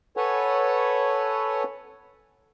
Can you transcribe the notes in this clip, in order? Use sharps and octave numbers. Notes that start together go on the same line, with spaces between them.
A4 B4 C#5 F#5 G#5